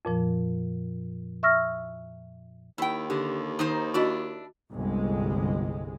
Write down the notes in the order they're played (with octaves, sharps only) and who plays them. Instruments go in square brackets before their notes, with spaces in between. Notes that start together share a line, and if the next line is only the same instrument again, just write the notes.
[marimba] F2 A#2 F3
E5 C#6 E6 F6 A#6
[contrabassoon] D#2 [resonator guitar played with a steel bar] E4 G5
[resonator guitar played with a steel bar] D3 [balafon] G4
[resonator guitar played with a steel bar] D#3 D#4 C5
[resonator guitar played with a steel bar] D4 E4 D5 [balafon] F#4 D#5
[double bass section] G1 C2 G#3